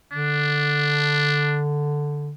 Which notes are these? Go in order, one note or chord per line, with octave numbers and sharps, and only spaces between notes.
D3 D4